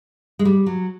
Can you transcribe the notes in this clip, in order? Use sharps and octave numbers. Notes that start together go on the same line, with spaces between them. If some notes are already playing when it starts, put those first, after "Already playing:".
G#3
G3
F#3